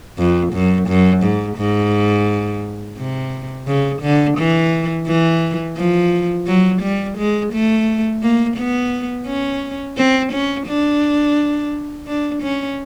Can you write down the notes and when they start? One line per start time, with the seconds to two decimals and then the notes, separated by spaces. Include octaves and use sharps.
0.18 F2
0.53 F#2
0.88 F#2
1.23 G#2
1.57 G#2
2.98 C3
3.67 C#3
4.02 D3
4.38 E3
5.07 E3
5.77 F3
6.47 F#3
6.82 G3
7.18 G#3
7.53 A3
8.22 A#3
8.57 B3
9.27 C#4
9.97 C4
10.33 C#4
10.67 D4
12.07 D4
12.43 C#4